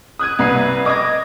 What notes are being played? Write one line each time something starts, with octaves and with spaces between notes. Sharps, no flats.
D#6 F#6 G#6 D#7
C2 B4 C7 D#7
D#5 D6 D#6 G#6 A#6